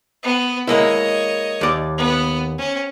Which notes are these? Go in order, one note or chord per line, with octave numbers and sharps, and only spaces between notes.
B3
G#3 A#3 E4 C#5 D#5
D#2 D5
B3
C#4